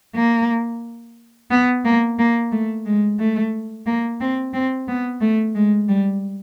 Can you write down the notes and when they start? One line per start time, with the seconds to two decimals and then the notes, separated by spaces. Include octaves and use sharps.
0.15 A#3
1.51 B3
1.85 A#3
2.19 A#3
2.52 A3
2.86 G#3
3.19 A3
3.86 A#3
4.21 C4
4.54 C4
4.88 B3
5.21 A3
5.55 G#3
5.89 G3